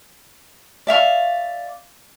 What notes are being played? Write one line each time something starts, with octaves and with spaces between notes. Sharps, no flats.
D5 E5 F5 C#6